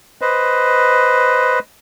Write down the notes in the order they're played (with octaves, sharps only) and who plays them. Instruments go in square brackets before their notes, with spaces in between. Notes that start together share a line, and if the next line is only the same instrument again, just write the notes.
[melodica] B4 C5 D#5